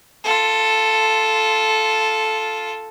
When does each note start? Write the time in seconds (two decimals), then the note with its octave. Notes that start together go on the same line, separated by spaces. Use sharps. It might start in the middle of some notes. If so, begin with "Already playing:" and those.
0.24 F4 A4